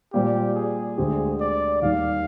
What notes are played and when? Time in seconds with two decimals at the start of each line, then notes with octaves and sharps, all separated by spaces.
0.13 A#2 G3 C4 G4
0.55 G#4
0.98 D2 D3 G#3 C4 G4
1.41 D5
1.82 D#2 D#3 G3 F5